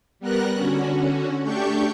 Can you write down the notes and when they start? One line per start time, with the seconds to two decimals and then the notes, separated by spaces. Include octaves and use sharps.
0.19 G3 B3 A#4 F#6 A#6
0.54 D3 C#4 F#4
1.43 A3 D4 G4 C#6 G6